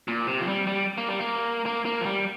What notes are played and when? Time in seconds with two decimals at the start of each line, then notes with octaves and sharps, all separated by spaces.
0.08 A#2
0.27 C3
0.41 F3
0.47 G3
0.67 G3
0.98 A#3
1.08 G3
1.19 A#3
1.66 A#3
1.85 A#3
2.01 F3
2.06 G3